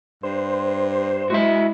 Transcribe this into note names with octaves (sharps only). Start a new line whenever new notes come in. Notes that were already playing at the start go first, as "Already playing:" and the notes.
G2 C5
G#3 E4 F#4 E5